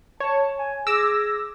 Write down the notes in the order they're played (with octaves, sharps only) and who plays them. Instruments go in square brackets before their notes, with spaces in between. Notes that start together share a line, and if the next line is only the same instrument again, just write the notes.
[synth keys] C#5 [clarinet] A5
[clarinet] G#5
[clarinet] G#4 [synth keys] D6 E6 A#6